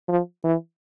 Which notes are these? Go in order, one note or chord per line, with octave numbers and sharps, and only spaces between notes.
F3
E3